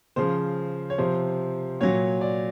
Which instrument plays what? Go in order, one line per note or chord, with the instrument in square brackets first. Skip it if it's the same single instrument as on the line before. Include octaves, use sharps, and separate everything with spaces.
[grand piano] C#3 F3 C5
C#5
C3 F3 C5
A#2 F#3 C#5
D5